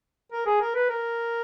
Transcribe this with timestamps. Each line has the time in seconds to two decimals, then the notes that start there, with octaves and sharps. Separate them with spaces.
0.32 A#4
0.46 G#4
0.61 A#4
0.75 B4
0.89 A#4